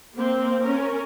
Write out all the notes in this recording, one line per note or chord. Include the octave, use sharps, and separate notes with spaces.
A#3 C4
C#4 A#4